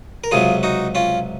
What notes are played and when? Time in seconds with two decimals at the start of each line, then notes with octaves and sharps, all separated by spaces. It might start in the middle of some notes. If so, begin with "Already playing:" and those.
0.24 A#4
0.31 C#2 C3 F#3 F4 G#4
0.63 D#4 F#4
0.95 C#4 F4